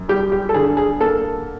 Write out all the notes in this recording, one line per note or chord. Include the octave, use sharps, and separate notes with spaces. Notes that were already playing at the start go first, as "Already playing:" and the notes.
Already playing: F#2
G3 G4
G4
A4
D3 G#4
G#4
A#3 A4